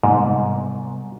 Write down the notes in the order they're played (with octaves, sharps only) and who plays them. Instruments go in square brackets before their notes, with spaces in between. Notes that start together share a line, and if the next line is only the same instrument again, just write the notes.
[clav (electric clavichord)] G#2 [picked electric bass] C3 G3 B3